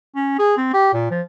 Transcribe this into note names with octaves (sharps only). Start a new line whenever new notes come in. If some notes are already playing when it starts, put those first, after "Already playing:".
C#4
G#4
C4
G4
A#2
F3